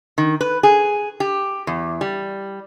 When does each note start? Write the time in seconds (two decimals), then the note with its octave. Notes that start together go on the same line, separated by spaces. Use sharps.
0.18 D#3
0.41 B4
0.63 G#4
1.20 G4
1.67 E2
2.01 G3